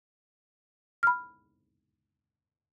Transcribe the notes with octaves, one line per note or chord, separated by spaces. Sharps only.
B5 F6